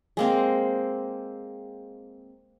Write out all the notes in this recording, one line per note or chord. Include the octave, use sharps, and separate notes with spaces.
G#3 A#3 C4